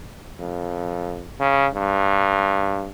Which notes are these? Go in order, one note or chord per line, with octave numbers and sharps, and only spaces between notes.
F2
C#3
G2